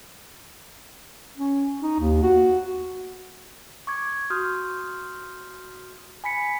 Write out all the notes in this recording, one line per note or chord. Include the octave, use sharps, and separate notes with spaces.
C#4
D#4
D#2
F#4
C#6 D6 G#6
F#4 C6 D#6 F6 G6
G#5 B5 B6 C#7